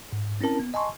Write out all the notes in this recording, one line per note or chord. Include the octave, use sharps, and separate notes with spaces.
G#2
C4 C#4 E4 A#4 A5
B3
D#5 G#5 A5 C6 C#6